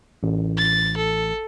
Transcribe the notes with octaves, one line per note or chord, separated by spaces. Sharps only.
A1
A6
A4